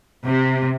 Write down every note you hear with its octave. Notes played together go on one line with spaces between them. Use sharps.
C3